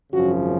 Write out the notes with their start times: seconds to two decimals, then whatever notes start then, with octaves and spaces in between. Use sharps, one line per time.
0.13 G#1 F#2 C#3 F3 F#4